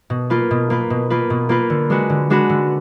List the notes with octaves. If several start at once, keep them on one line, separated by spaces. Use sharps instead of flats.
B2
A#3 F4 B4
B2
A#3 F4 B4
B2
A#3 F4 B4
B2
A#3 F4 B4
D3
G#3 D4 F#4 B4
D3
G#3 D4 F#4 B4
D3